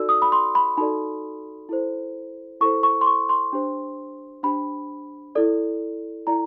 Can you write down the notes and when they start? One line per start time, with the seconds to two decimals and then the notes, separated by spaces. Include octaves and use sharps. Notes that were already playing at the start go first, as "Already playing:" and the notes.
Already playing: D#4 F#4 A4 D5 E6
0.09 D#6
0.22 B5
0.32 C6
0.55 B5
0.77 D#4 F#4 A4 D5 B5
1.69 E4 A4 C5
2.61 E4 A4 C5 C#6
2.83 C#6
3.01 C6
3.07 C#6
3.29 C6
3.53 D4 G4 C5
4.43 D4 G4 C5 B5
5.35 E4 A4 D5
6.27 E4 A4 D5 A#5